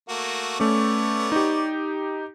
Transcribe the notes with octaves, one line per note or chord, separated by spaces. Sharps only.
A3 A#3 F#4
A3 B3 C#4 C#5 D5
D#4 G4